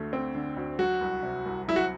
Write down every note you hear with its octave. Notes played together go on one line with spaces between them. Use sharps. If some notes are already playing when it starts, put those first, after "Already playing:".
Already playing: D2 D3 A3
C4
D3
D2
F#3 F#4
C2
C3
C2
F#3 E4
F#4